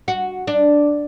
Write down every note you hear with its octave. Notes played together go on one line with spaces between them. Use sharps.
F#4
D4